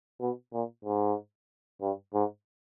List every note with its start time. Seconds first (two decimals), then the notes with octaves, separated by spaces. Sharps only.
0.20 B2
0.53 A#2
0.85 G#2
1.81 G2
2.14 G#2